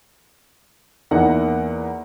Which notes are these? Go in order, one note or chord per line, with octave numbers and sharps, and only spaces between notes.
E2 E3 A#3 D#4 F#5